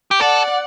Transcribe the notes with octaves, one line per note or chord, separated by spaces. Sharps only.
G4
A4 D5 F#5